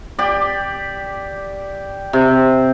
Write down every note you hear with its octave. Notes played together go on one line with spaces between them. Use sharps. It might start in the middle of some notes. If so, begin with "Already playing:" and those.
G4 D5
C3